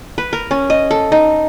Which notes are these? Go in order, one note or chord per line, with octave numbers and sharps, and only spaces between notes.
B4
A#4
C#4
D#5
A4
D#4